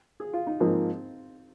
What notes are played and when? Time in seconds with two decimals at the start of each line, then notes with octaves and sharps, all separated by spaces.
0.20 G#4
0.33 F4
0.47 D#4
0.60 G#2 F3 A#3 C4